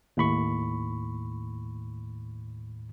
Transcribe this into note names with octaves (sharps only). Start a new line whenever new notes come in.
D#2 A2 B5 C#6